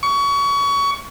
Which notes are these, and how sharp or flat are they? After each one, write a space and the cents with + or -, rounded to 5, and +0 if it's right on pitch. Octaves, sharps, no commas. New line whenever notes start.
C#6 +25